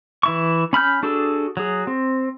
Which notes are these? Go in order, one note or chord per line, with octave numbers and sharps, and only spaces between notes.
E3 E4 C#6
C#4 B5 F6 G6
D4 F#4 G#4 A4
F#3 G#4
C4